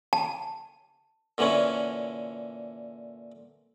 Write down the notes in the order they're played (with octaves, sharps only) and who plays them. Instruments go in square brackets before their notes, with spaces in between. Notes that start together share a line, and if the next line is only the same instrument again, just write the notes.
[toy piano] A5
[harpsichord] A#2 D3 E3 C#4